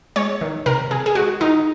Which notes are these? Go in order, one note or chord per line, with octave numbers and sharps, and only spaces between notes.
G#3 C#5
D#3
C3 A#4
C3 G#4
G#4
G#3 F#4
D#3 D#4